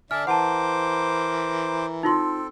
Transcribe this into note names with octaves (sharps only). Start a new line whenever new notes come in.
D3 D4 D5 E5 G#5 F6
E3 A#4 C5 F#5 A5 D6
C4 D#4 F4 A4 C6